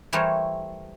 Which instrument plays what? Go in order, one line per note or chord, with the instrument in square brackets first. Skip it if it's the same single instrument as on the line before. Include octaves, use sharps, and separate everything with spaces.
[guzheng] E3 G3 A3 A#4 C5 C#5